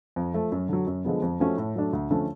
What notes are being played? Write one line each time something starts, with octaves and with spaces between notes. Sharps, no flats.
F2
F3 A3
F#2
D3 F#3
F#2
D3 F3 G#3 B3
F2
F3 A3 C#4 F#4
A2
F#3 A3 D4
D2
D3 F3 A3 C#4